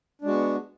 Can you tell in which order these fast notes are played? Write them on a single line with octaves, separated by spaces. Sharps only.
D4 G#3 F#4 B3